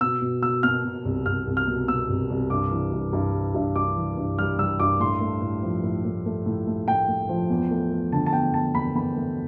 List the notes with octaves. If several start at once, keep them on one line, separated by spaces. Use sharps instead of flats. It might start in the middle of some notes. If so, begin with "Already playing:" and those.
B2 E6
B2
B2 E6
B2 F6
B2
C2
C2 F6
C2
F6
B2
B2 E6
C2
C2
G2 D6
E3
G2
G2
G3
G2
G2 D6
E3
G2
G3 F6
G3 E6
G2 D6
A2 C6
A3
A2
F3
A2
A2
A3
A2
A3
A2 G5
A3
F3
E2
A3
A3
D3 A5
A5
E2 G5
E2 A5
E2 B5
E2 B5
A3